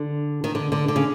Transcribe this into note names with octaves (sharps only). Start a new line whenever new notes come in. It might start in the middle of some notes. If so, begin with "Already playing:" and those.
Already playing: D3
D#3
D3
D3
D3
C#3